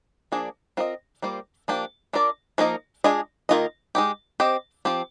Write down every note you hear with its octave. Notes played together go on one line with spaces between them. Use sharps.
F3 A#3 D4 G#4 D5
C4 F4 A#4 D#5
G3 A#3 F4 C5
F3 A#3 D4 G4
D4 F4 A#4 D5
F3 A#3 D#4 A#4 D#5
G#3 D4 F4 G#4 D#5
D#3 A#3 F4 A#4 D#5
G#3 D#4 G4
C4 G4 C5 D#5
F3 C4 G4